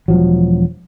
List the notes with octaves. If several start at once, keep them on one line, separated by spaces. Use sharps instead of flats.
E1 F3 F#3